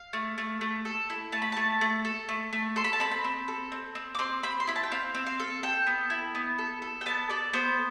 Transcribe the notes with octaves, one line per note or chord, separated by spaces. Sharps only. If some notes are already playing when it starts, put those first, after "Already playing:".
Already playing: F5
A3
A3
A3
A4
E4
A3 A5
B5
A3 A5
A3
A4
A3
A3
A4 C6
B5
A5
C4 B5
B5
C4
A4
C4
C4
D6
C4 C6
C4 B5
C6
E4 B5
A5
G5
C4 F5
C4
F5
A4
A4 G5
B3
E4
B3
A4
A4
G5
B3 A5
A4 D5
B3 C5